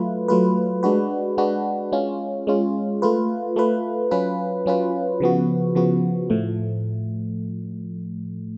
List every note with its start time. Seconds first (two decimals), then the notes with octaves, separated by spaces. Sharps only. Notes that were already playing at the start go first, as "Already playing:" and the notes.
Already playing: F#3 A3 F4 B4
0.28 F#3 A3 F4 B4
0.83 G#3 D4 F#4 B4
1.38 G#3 D4 F#4 B4
1.92 G#3 C#4 F4
2.47 G#3 C#4 F4
3.02 A3 F4 B4
3.56 A3 F4 B4
4.11 F#3 C#4 F4 B4
4.66 F#3 C#4 F4 B4
5.20 C#3 F3 B3 F#4
5.75 C#3 F3 B3 F#4
6.30 A2 F3 A3